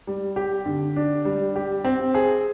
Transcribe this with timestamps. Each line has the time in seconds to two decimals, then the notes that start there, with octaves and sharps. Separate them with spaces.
0.07 G3
0.36 G4
0.66 D3
0.96 D4
1.25 G3
1.56 G4
1.84 C4
2.15 G#4